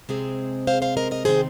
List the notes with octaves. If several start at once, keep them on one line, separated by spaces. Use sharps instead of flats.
C3 G#3 C4 G#4 C5
C5 F5
C5 F5
A#4 D#5
A#4 D#5
C3 D#3 C4 D#4 G#4 C5